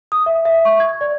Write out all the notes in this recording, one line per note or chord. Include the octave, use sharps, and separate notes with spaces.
D#6
E5
E5
C#6
G#6
D5